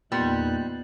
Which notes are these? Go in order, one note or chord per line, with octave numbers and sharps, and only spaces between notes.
E2 A#2 G3 B3 D#4 C6 F#6 C#7